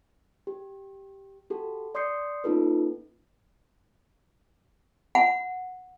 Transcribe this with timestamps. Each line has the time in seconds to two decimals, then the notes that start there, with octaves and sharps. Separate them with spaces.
0.47 G4
1.50 F#4 G4 A4
1.95 D5 C6 D#6 G6 C7 C#7
2.44 A#3 C#4 D#4 F4 A4 B4
5.15 F#5